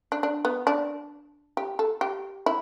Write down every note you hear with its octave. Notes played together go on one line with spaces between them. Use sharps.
D4
D4
B3
D4
G4
A4
G4
E4